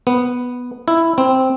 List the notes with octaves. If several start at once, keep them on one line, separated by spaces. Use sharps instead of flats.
B3
E4
C4